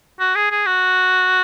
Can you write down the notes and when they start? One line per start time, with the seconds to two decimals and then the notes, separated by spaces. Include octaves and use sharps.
0.20 F#4
0.36 G#4
0.51 G#4
0.66 F#4